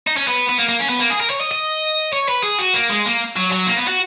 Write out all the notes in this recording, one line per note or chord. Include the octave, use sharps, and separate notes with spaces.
D#4
C#4
B3
B3
A#3
A#3
C#4
B3
A#3
G#4
A#4
C#5
D#5
D#5
C#5
B4
G#4
F#4
A#3
G#3
A#3
F#3
F#3
A#3
B3
F#4